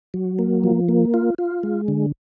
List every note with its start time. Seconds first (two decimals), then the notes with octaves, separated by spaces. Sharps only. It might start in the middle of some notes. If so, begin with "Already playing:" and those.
0.14 F#3
0.39 A#3
0.64 F3
0.89 A#3
1.14 F4
1.38 F4
1.63 G#3
1.88 D3